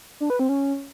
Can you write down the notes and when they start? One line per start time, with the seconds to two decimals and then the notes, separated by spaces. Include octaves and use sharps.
0.20 D4
0.30 B4
0.39 C4
0.49 C#4